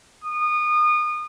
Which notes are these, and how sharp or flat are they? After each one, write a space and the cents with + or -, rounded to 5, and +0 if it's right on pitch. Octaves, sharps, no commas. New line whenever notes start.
D#6 -30